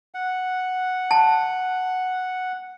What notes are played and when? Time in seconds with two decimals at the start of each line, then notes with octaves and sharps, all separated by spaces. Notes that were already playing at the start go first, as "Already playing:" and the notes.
0.15 F#5
1.11 A5